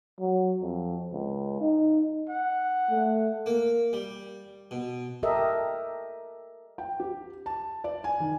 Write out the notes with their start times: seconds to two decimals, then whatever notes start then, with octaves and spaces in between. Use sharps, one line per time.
0.20 F#3
0.62 F2
1.13 C#2
1.61 D#4
2.29 F#5
2.90 A3
3.46 A#3
3.93 G3
4.71 B2
5.23 G4 A4 A#4 D#5 E5
6.78 G5
7.00 G4
7.46 A5
7.84 D5
8.04 G#5
8.20 D#3